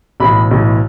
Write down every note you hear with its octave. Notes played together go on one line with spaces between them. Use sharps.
B1 A2 E3 B5
B1 A2 E3